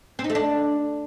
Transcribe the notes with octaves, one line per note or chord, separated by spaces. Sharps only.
C4
D#4
A3
D4